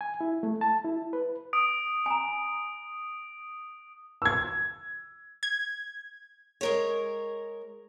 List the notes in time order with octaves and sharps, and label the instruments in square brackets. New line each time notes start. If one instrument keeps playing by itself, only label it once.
[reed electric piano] G#5
E4
A3
A5
E4
B4
[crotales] D#6 D7
[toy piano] G#5 A#5
[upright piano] E6 G#6
[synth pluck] G#6
[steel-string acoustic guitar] G#3 A#4 C#5